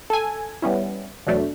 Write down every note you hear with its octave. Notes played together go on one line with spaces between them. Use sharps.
A4 G#5
G3 B3 C#4 E4
E2 B2 F#3 A3 D4